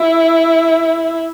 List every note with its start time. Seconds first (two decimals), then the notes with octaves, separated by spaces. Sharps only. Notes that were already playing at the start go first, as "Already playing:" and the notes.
Already playing: E4